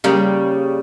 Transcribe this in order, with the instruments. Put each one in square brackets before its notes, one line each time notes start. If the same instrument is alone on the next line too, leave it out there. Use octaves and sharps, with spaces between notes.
[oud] C#3 G3 A#3